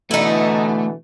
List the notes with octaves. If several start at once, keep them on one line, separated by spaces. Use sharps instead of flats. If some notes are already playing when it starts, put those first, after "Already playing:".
B2 D3 E3 A3 D#4 E4